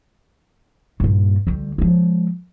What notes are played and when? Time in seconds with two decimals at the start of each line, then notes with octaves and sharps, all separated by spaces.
1.00 G2 A#2
1.47 D2 G3
1.78 F3 G#3